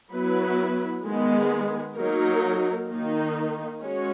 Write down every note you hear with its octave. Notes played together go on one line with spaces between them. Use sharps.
F#3 B3 E4 B4
D#3 G#3 B3
F#3 A#3 D#4 A#4
D#3 A#3 D#4
G#3 C#4 F#4 C#5